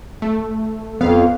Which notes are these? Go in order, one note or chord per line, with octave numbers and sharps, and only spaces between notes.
A3
F2 B3 F5